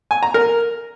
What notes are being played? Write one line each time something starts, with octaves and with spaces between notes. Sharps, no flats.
G#5
A#5
A#4